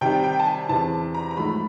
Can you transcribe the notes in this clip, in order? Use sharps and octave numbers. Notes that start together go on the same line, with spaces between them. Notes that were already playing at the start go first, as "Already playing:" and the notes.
C3 D#3 G3 G5
G5
A5
G#5
E2 C3 E3 A5
A#5
A#5
G#2 F3 A3 B5